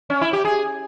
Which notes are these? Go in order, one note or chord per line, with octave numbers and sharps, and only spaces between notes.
C#4
E4
G4
G#4